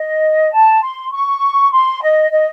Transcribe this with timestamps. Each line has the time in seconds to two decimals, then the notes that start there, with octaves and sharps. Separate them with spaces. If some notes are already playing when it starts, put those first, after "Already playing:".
Already playing: D#5
0.53 A5
0.83 C6
1.12 C#6
1.72 C6
2.02 D#5
2.31 D#5